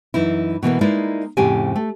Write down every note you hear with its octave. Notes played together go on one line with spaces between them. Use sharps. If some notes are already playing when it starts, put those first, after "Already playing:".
F#2 E3 D#4 E4
B2 E3 A#3 B3
G#3 A#3 D#4 E4 B4 D5
F2 A2 C#3 C4 G4 G#5
A3